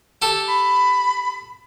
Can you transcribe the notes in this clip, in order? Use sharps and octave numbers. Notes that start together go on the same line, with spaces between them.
G4 A4
B5